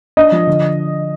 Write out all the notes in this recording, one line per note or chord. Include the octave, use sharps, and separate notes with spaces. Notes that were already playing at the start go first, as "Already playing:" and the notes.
D4 D#5
F3
D3